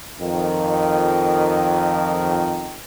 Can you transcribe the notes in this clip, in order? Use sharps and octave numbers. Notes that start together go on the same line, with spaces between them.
F2 D#3